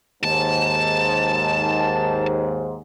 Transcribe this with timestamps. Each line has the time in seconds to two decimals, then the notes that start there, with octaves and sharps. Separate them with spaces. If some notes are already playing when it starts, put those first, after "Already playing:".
0.23 D#2 G#2 A5